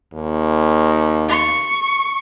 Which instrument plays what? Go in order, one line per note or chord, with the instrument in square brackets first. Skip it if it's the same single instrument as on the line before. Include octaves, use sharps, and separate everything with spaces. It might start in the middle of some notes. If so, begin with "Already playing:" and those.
[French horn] D#2
[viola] C#6